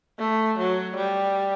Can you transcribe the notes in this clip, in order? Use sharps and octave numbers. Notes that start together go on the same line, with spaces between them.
A3
F#3
G3